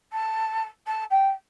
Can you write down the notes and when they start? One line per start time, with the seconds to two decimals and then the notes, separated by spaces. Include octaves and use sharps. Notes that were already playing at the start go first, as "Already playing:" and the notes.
0.12 A5
0.87 A5
1.10 G5